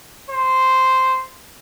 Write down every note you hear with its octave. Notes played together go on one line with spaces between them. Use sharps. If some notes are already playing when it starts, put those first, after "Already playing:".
C5